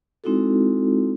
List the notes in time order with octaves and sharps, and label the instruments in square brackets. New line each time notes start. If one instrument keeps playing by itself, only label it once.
[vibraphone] G#3 C4 D#4 E4 F#4 A4